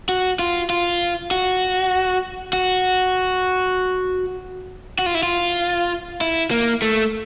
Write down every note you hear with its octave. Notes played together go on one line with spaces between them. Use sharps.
F#4
F4
F4
F#4
F#4
F#4
F4
E4
F4
E4
A#3
A3